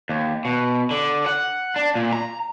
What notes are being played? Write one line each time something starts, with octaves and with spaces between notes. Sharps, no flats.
D#2
B2
D3
F#5
D4
A#2
A#5